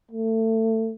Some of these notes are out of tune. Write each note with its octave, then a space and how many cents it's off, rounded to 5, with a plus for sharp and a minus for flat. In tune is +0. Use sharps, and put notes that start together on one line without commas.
A3 +25